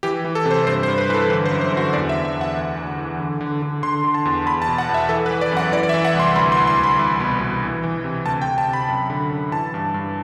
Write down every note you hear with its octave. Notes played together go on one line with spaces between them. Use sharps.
E3 G4
E3
A4
C3
C5
G2 C5
C5
G2
B4
E3 B4
A4
D3 B4
C5
F#2
C5
D3 F#4
E2 D5
E5
E2
E5
E2
F#5
D2
D2
E3
D3
D3
D3
D3 C6
D3
A5
E2
E2 B5
A5
B2
F#5
E2
E5
E3 A4
B4
E3
D5
F#2 F#5
E3 D5
D5
E5
E3
F#5
C2
C6
D2 B5
C6
D2
C6
D2
B5
C2
B2
B2
E3
E3
C3
D2 A5
G5
D2
A5
C3
B5
F#2
D3
F#2
E3 A5
G2
G2